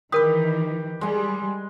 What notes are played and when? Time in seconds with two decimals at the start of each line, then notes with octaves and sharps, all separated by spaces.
0.12 D#3 E3 G4 A#4 B4 D#6
1.01 G3 G#3 G#5